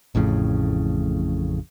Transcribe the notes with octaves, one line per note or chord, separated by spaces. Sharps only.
A1 F2 A2 C#3